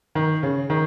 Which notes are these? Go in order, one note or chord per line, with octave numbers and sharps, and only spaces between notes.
D#3
C#3
D#3